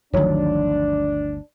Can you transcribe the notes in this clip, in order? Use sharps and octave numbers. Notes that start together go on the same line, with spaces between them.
G1 D2 D#3 F3 F#3 D4 C#5